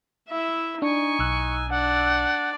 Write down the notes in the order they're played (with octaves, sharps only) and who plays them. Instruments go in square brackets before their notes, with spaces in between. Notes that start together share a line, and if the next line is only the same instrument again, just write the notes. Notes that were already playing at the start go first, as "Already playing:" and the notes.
[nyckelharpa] E4 E5
[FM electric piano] D4 [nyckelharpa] D#4 G#5 [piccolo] C#6
[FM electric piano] B1 E6 F#6
[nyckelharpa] D4 D5 [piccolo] F#5